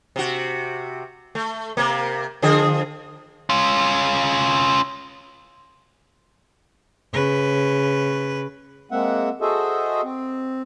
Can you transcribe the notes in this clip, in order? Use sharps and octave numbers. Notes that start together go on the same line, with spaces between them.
C3 F#4
A3
C3 A#3
D3 F3 G#4
C#4 F4
C#3 B4
G#3 A#3 C4 E5 F#5
F#4 G#4 A4 C5 D#5 E5
C4